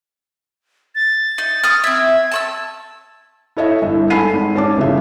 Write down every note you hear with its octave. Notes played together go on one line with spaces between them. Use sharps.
A6
D#4
C#6 D#6 F6
C4 E5 G#6
A5 C#6 E6
E4 A4 C#5 D#5 E5
G1 A2 E5
G#2 A4 G#5 B5 C7 D#7
G#1
G#2 C#4 A5 D6
G1 C#3 F3 E5